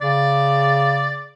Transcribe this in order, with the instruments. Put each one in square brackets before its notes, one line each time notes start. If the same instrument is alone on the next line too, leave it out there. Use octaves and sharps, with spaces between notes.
[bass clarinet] C#3 [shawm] D5